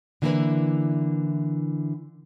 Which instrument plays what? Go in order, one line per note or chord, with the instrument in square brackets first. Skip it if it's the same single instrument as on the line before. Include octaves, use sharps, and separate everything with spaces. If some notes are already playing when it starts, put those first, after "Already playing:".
[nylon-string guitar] D3 E3 A#3 C4 E4 B4